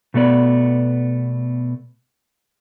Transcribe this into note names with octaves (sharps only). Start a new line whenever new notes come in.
B2 A3 B3 D5